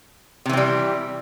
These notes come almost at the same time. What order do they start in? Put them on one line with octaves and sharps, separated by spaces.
C3 E3 C4 G3